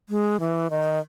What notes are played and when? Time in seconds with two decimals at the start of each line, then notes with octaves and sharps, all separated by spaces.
0.09 G#3
0.40 E3
0.71 D#3